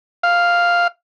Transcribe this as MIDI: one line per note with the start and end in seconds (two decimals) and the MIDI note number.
0.23 0.87 77